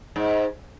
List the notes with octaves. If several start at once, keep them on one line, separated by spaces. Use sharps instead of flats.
G#2